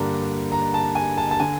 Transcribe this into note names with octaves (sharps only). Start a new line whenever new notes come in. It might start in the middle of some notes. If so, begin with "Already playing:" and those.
Already playing: G2 D3 G3 A#3 D4 A#5
A#5
A5
G#5
A5
A5
D3 G#5